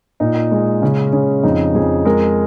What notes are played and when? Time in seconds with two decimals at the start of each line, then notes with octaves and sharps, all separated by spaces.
0.20 A#2 D#4
0.51 G#3
0.82 C#3 C#4
1.13 C#3
1.44 F2 D#4
1.75 F2 G#4
2.05 G#3 A#4